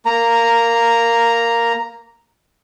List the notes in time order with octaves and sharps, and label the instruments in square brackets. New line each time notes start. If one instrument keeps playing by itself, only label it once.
[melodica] A#3 A#5